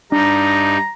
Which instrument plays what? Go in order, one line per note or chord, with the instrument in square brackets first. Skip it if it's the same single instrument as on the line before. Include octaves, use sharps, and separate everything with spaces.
[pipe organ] G2 G3 D#4 [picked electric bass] D4 [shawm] A#5